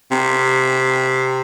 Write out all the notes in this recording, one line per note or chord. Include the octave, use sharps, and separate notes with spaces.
C3